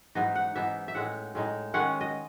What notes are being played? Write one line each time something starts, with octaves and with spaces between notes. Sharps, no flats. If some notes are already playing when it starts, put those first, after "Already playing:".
G#2 E3 B3 D#4 D#5
F#5
G#2 E3 B3 D#4 E5
E5
A2 G#3 D#4 F#5
A2 G#3 D#4
D#3 G#3 C#4 F#5
D#5